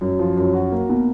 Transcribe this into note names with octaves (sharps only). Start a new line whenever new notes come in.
F#2
F3
F#2
F#4
A#3
B2